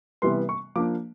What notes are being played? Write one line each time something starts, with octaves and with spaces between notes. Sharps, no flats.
C3 E3 G3 B3 C6
C#6
F3 A#3 D4 D6